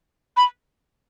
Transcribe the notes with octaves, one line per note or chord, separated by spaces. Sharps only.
B5